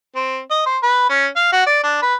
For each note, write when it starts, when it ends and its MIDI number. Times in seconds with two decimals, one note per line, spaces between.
0.16 0.39 60
0.51 0.61 75
0.66 0.77 72
0.83 1.07 71
1.09 1.27 61
1.36 1.52 77
1.53 1.66 66
1.66 1.81 74
1.84 2.02 62
2.02 2.15 71